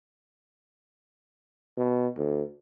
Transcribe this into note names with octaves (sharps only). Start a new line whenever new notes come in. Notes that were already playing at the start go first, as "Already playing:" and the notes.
B2
D2